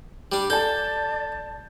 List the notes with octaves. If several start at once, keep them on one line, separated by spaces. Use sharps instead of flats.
G3 D4
A4 D5 A5 G6